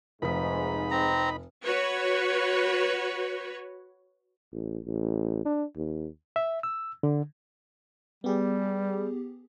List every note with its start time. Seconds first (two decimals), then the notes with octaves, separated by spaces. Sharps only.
0.22 F1 G#2 D#4 B5 B6
0.91 C4 A#5
1.65 F#4 B4 C#5
4.53 A1
4.85 A1
5.45 D4
5.76 D#2
6.36 E5
6.63 E6
7.03 D3
8.24 G3 B3 G4 G#4